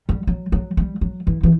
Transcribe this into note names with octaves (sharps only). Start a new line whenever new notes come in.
G3
F#3
F#3
G3
F#3
E3
E3